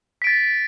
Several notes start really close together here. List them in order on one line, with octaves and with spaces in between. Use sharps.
B6 D7 A6